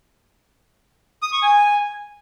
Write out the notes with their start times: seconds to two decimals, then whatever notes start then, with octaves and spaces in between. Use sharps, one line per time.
1.22 D#6
1.32 C#6
1.42 G#5